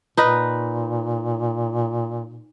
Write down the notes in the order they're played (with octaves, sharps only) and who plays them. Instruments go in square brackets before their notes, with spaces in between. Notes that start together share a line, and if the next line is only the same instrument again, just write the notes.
[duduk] A#2 [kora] D#4 B4 D#5